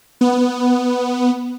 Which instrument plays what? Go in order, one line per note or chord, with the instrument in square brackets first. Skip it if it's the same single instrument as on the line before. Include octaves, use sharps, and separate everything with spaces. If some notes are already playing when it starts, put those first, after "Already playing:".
[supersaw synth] B3